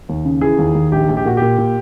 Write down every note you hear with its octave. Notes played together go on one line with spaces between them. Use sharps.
D#2
C#3
E3 G#4
D#2
D#2
A#1 G4
A#1
G4
A#2 F#4
A#2 G4
A#2